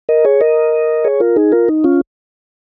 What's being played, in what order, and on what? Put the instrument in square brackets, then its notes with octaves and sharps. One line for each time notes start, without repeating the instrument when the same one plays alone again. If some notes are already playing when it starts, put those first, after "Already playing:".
[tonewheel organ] A#4 D#5
G#4 C#5
A#4 D#5
G#4 C#5
F4 A#4
D#4 G#4
F4 A#4
D#4
C#4 F4